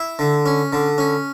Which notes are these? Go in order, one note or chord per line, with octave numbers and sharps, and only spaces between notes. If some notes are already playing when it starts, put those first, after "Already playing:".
Already playing: E4
D3
C#4
D3
C#4